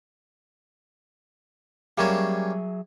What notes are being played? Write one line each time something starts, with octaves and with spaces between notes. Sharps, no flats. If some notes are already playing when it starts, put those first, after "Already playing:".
F#3 G3 A#3 C#4 G#4 E5